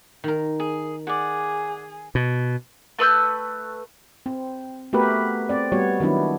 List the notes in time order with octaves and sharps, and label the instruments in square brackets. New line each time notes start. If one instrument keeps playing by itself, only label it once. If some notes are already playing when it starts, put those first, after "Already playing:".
[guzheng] D#3 A#4
[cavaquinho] G#4
[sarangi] G#4 [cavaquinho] D5 F#5
[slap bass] B2
[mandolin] A3 B4 E6 G6
[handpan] C4
A3 B3 F#4 G4 A#4 B4
C4 D5
G3 B3 F#4 C#5
D#3 F#3 B3 D4 E4